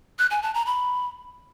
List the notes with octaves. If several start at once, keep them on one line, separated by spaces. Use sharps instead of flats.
F#6
G#5
A5
A#5
B5